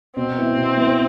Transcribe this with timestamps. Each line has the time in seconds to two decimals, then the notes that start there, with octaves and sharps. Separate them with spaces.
0.16 B2 C4
0.37 B3 E4 B4
0.57 B2
0.77 B3 E4 B4